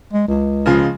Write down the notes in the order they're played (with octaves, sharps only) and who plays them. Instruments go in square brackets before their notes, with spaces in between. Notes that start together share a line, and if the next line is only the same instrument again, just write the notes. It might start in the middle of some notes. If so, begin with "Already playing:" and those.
[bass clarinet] G#3
C#2
[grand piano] C#3 F3 G#3